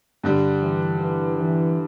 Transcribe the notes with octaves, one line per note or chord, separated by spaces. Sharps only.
G2 D3 G3
E3
E3
E3